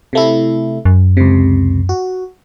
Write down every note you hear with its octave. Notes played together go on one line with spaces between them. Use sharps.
C3 A3 E4
F#2
C#2 C3
F#4